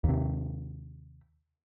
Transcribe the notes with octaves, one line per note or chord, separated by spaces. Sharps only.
D#2 C3